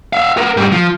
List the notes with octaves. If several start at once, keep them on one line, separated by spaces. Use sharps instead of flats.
E5 F5
B3 A#4
G#2 G3
F3